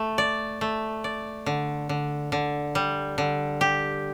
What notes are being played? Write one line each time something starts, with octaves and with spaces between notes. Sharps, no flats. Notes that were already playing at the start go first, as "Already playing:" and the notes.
Already playing: A3
D5
A3
D5
D3
D3
D3
G3
D3
G4